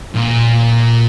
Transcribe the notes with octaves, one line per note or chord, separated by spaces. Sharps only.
A#2